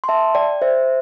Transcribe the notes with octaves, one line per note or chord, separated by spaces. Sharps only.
C6
E5 A5
D5 G5
C5 E5